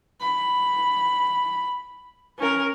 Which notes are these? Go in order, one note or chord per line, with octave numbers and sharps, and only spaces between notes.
B5
C#4 A#4